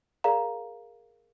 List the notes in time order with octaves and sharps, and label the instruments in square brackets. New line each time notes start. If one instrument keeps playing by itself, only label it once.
[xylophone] G#4 A#4 D5 F5 A#5